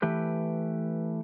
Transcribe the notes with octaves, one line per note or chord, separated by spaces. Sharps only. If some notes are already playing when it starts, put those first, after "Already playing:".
E3 A3 G4 B4